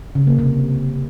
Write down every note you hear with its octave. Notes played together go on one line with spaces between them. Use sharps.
C#3
A#3
C3